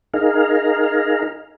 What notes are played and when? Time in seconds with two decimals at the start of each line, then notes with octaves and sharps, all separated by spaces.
0.14 D#4 G#4 A#4 F5